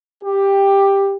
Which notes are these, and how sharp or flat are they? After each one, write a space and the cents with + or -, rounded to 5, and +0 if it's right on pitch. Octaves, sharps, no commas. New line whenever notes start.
G4 +10